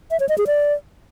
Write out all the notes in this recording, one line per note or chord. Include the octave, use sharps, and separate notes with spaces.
E5
C#5
D#5
G#4
D5